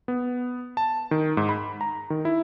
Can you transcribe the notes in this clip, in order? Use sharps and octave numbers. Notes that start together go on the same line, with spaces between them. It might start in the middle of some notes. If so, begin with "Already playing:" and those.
B3
A5
D#3
G#2
B5
A#5
D#3
E4